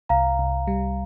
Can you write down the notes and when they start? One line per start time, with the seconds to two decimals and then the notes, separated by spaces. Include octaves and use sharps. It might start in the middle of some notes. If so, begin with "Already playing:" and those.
0.09 C2 F5 A#5
0.39 C2
0.67 G3